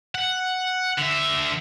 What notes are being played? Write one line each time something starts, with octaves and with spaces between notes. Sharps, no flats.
F#5
D3 E5